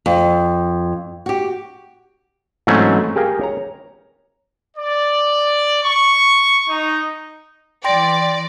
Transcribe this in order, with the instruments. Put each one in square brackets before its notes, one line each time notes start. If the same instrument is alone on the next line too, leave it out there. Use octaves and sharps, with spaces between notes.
[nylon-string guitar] F2
F#4 G4
[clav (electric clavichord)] G#2 E3 F#3 A3 C4 C#4
G4 G#4 A#4 F5 G5 G#5
C#5 A#5
[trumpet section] D5
C#6
D#4
[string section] E3 D5 [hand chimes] G5 C6 A#6